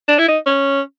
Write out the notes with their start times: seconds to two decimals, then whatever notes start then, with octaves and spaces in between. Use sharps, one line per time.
0.08 D4
0.18 E4
0.28 D#4
0.46 C#4